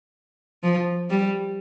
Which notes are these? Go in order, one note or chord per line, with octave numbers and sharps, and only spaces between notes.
F3
G3